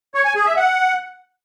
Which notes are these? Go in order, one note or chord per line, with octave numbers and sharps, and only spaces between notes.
C#5
G#5
G#4
E5
F#5